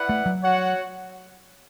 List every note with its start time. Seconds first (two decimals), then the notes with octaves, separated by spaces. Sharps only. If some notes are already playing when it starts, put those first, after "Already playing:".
Already playing: E4 B4 D5 F#5
0.09 A3
0.26 F#3
0.42 F#4 C#5 F#5